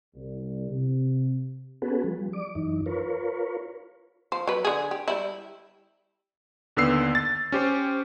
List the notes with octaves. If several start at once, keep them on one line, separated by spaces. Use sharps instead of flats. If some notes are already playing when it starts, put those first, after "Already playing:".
C2
C3
B3 C#4 F#4 G#4 A4 B4
F3 G3
D5 D6
F#2 E3 D#4
F4 A#4 B4 C#5
F3 C5
F#3 B4
D3 G#4
G4
G3 E4
D#2 D3 B3 E6 C7
A6
C#4 G4 C5